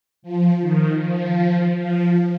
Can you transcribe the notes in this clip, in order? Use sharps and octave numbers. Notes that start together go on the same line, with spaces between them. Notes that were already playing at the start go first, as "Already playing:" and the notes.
F3
D#3
F3
F3